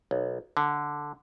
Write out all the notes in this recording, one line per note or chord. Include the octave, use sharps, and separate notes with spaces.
B1
D3